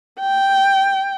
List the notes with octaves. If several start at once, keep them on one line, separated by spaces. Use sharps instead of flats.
G5